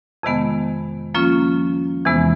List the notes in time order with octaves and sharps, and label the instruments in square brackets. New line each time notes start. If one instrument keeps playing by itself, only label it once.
[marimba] F2 C3 D#3 G#3 B3
F3 A#3 C#4 F4
E2 C3 E3 G#3 B3